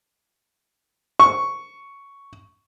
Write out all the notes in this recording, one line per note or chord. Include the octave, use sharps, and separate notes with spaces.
C#6